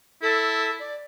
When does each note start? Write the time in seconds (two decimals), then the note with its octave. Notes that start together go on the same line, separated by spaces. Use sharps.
0.22 E4 A4
0.80 D5